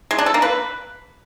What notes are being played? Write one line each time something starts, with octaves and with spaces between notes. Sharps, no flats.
G#3
D4
A4
A#3
B4